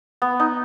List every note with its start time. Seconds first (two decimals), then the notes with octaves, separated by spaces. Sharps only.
0.22 B3
0.40 D#4